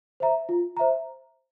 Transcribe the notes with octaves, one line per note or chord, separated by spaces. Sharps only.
C5 E5 A#5
F4
C5 E5 A#5